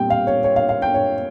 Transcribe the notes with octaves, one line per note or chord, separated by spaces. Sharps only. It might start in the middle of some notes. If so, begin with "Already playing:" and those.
Already playing: A#2 G3 C4 G5
F5
C#5
C#5
F5
F5
G5
C#5